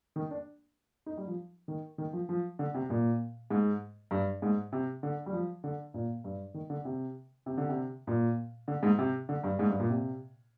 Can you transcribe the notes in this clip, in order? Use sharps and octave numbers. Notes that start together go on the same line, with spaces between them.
D#3
D4
D#4
G3
F3
D#3
D#3
F3
F3
D3
C3
A#2
G#2
G2
G#2
C3
D3
G3
F3
D3
A#2
G2
D#3
D3
C3
C3
D3
C3
A#2
D3
G#2
C3
D3
G2
G#2
G2
A#2
C3